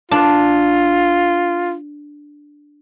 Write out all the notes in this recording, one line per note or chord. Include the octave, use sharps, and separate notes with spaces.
D4 F4